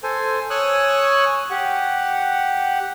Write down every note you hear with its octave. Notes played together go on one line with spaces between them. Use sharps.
A4 C5 G#5
C#5 G#5 C#6 D#6 E6 F#6
G4 F#5